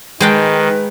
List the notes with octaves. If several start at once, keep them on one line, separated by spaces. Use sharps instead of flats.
D#3 G#3 B4 G5 A5